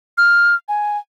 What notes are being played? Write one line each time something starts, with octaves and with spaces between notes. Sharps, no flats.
F6
G#5